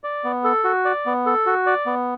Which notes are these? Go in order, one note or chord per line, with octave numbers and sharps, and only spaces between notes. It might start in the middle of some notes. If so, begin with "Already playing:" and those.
D5
B3
A4
F#4
D5
B3
A4
F#4
D5
B3